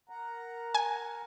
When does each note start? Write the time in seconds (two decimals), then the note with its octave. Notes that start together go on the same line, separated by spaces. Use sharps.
0.09 A#4 F#5 A#5
0.74 G#5